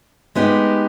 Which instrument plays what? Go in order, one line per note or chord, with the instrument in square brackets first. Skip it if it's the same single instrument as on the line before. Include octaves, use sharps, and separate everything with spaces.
[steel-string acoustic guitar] G#3 B3 D#4 G4